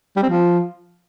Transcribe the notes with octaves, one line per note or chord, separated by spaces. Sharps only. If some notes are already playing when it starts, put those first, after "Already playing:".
G3
C4
F3